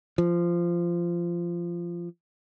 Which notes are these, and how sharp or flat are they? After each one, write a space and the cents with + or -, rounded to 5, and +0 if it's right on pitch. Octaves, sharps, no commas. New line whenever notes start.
F3 -15